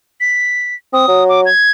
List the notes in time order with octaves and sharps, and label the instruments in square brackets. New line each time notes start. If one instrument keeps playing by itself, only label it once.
[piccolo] B6
[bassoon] C4 [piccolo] D#6
[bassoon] F#3
[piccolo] D6
G#6